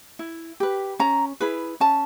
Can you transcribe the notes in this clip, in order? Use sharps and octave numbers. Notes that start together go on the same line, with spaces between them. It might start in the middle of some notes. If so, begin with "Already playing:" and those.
E4
G4 B4
C#4 A#5
E4 G#4 B4
C#4 A5